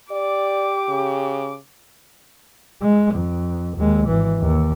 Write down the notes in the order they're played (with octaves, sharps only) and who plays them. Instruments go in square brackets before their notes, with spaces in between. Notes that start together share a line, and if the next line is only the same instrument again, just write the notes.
[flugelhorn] G4 [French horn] D5 [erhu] D6
[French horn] C#3
[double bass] G#3
F2
D#2 G#3
G#1 E3
D#2